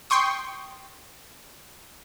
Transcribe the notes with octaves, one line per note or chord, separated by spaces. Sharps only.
G5 C6 C#6 D#6